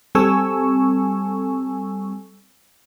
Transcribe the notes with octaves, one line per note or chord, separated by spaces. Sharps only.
G3 C4 A4 G#5 C#6 E6